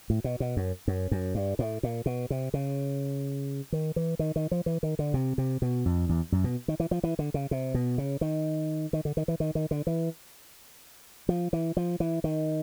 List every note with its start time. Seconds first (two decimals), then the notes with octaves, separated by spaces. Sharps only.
0.10 A2
0.24 B2
0.40 B2
0.57 F#2
0.88 F#2
1.11 F#2
1.35 G2
1.59 A2
1.83 A#2
2.06 B2
2.30 C3
2.54 C#3
3.72 D#3
3.96 E3
4.19 D#3
4.36 D#3
4.51 F3
4.66 E3
4.83 D#3
4.99 D3
5.14 C3
5.38 C3
5.62 B2
5.86 F2
6.09 E2
6.32 F#2
6.44 B2
6.68 D#3
6.80 E3
6.91 F3
7.03 E3
7.19 D3
7.34 C#3
7.51 C3
7.74 B2
7.98 C#3
8.21 D#3
8.93 D#3
9.05 D3
9.17 D#3
9.28 E3
9.40 D#3
9.55 D#3
9.71 D3
9.87 E3
11.29 F3
11.53 E3
11.77 F3
12.00 E3
12.24 D#3